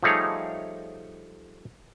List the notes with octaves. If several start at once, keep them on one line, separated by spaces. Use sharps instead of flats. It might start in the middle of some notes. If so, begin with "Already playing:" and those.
F3 G3 A3 D#4 G#4 C#5